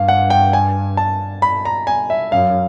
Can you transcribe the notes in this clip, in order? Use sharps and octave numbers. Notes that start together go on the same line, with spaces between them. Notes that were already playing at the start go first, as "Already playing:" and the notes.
Already playing: G2 F5
F#5
G5
G#5
A5
B5
A#5
G#5
E5
F#2 F5